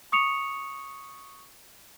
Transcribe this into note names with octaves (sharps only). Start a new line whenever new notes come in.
C#6 D#6 C#7 F7